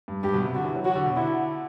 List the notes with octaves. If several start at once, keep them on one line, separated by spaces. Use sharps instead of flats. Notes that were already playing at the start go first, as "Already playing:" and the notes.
G2
G2 G4
B2
C3
D3 F#4
E3
F#3
F#3 F#4
D3
B2
D3 E4